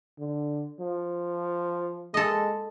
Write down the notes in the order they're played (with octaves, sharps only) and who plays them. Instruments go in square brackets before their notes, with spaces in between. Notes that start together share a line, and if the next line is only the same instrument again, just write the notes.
[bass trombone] D3
F3
[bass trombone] G#3 [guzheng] A4 D#5